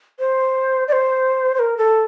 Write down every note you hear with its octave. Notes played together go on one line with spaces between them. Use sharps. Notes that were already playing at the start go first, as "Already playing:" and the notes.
C5
D5
C5
C5
A#4
A4